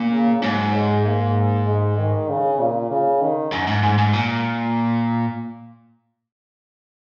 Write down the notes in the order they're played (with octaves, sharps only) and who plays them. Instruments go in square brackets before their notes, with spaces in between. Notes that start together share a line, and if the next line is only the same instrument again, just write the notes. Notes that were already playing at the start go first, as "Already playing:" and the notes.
Already playing: [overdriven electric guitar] A#2
[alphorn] C#3
[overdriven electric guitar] G#2 [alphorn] F#3
[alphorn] G#3
A#3
G#3
D#3
C#3
A#2
C#3
D#3
[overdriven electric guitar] F#2
G#2
G#2
G#2
A#2